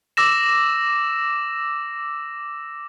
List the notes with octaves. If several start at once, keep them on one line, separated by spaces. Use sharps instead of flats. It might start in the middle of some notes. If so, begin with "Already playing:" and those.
D6 E6 A#6 E7